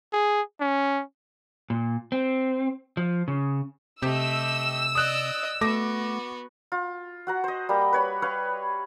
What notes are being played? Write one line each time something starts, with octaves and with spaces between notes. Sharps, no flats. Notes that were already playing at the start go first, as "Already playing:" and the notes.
G#4
C#4
A#2
C4
F3
C#3
C3 A3 G4 D#5 E6
D5 D#5 D#6 F#6
A3 B3 F#4 D6 A#6
F4
F#4 F#5 A#5
C5 D#5
G3 A#3 B5
B4 C#5 B5
B4 C#5 F5 C#6